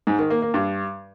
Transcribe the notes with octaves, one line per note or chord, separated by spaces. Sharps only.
G#2
D#3
A#3
A#3
G2